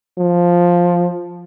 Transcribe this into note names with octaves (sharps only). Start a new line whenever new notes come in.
F3